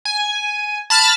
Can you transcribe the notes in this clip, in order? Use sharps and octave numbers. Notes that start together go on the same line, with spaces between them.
G#5
A5 B5 F6 A6